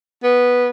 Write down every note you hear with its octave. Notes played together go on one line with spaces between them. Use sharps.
B3